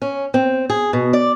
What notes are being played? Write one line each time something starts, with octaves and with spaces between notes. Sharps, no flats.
C#4
C4
G#4
B2
D5